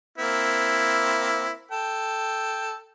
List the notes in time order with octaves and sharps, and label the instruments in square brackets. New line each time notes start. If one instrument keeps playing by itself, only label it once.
[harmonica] A#3 C4 E4
A4 G5